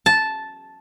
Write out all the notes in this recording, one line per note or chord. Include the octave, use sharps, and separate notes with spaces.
A5